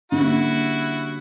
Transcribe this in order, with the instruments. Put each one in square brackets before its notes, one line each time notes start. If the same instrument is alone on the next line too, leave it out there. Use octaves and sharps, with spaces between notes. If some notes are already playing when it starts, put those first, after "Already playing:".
[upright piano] D3 G3 A#3 C#4 [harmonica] E4 F#4